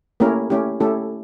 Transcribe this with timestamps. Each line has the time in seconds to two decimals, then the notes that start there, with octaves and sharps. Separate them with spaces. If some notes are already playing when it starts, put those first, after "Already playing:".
0.20 A3 A#3 C#4 E4 G4 A#4
0.50 A3 C#4 E4 G4
0.80 A3 C#4 E4 G4 A4